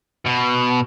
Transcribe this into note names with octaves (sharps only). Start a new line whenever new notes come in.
B2